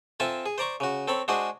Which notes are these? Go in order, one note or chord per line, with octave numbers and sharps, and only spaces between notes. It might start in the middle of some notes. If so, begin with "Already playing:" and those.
C4 F4 A4 E5 G#5 A5
G#4
C5 D5 A#5 C#6
C#3 F#4
C4 A4 C#5 B5
G#3 D4 F#4 G#4 C5 F#5